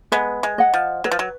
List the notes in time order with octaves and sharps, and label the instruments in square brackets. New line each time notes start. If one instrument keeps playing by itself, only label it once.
[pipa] G#3 B3 [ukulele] B4
[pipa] G#3
[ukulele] D#5 F#5
[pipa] F3
[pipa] F#3 [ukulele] B4
[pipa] F3
F#3